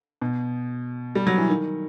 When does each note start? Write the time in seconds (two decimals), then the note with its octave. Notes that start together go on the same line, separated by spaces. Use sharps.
0.22 B2
1.15 G3
1.27 F#3
1.37 E3
1.49 D#3